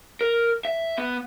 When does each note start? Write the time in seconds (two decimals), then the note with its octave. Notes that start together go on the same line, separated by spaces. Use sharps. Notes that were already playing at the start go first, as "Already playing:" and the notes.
0.21 A#4
0.65 E5
0.98 B3